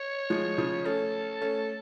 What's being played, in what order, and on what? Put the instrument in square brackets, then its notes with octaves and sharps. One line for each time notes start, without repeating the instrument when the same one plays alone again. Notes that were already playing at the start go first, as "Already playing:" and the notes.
Already playing: [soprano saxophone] C#5
[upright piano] F3 G#3
C#3 F3
[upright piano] A3 C#4 [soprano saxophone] A4
[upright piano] A3 C#4